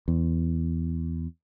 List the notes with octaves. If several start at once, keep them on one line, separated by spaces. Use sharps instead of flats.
E2